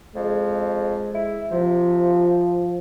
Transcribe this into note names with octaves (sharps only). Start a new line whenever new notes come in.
F2 G#3
E4
C3 F3